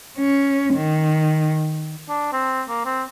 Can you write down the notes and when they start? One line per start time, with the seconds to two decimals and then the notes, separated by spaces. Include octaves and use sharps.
0.19 C#4
0.74 D#3
2.09 D4
2.33 C4
2.68 A#3
2.85 C4